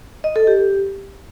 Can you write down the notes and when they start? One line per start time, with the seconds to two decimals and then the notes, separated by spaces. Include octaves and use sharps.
0.24 D#5
0.36 A4
0.47 G4